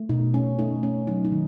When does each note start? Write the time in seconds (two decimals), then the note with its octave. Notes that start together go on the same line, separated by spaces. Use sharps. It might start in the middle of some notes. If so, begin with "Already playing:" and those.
Already playing: A3
0.09 B2 D#4
0.33 A3 C#4
0.59 A3 D#4
0.83 A3 C#4
1.07 F#3 D#4
1.25 D#4
1.32 D#3